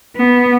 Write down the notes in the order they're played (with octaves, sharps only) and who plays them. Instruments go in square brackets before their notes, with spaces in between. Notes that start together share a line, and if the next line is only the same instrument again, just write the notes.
[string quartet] B3